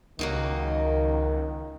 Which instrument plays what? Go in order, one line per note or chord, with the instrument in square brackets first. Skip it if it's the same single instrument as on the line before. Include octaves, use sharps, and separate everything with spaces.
[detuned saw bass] C#2 [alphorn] D#3 [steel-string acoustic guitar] F#3 A#3 D#4